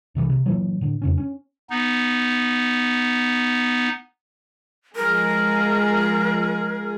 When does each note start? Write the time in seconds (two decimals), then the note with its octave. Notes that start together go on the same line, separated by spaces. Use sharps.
0.15 C2 C3 D#3 E3
0.30 C3
0.46 A#2 E3 F#3
0.81 A2 D3
1.02 F2 C#3 C#4
1.18 C#4
1.70 B3 D#4
4.96 F3 G#3 G#4 A#4